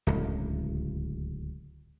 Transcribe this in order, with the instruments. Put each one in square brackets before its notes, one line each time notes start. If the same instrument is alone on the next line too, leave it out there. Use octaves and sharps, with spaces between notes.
[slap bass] D1 C#2